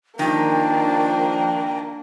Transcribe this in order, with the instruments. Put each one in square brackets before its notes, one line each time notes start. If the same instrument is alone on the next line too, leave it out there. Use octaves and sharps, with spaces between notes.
[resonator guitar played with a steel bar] D#3 [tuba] F3 [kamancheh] A#3 D4 [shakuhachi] G5